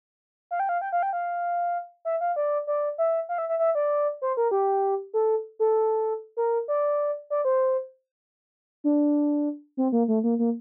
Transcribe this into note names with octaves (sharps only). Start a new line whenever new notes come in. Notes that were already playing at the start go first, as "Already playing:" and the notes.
F5
G5
F5
G5
F5
G5
F5
E5
F5
D5
D5
E5
F5
E5
E5
E5
D5
C5
A#4
G4
A4
A4
A#4
D5
D5
C5
D4
C4
A#3
A3
A#3
A#3